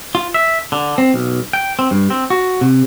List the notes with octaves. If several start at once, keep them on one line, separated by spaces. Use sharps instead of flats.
F4
E5
D3
C4
B1
G5
C4
G2
C4
F#4
C3